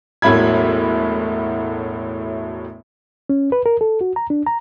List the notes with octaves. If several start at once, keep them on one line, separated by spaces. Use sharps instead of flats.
E1 A2 F#3 E4 B5 G#6
C#4
B4
A#4
A4
F#4
A#5
D4
A#5